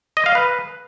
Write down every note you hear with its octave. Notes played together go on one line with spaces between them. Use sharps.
D#5
F5
B4